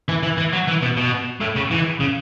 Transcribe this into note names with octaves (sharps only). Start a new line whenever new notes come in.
E3
E3
E3
F#3
E3
B2
B2
A2
C#3
E3
C#3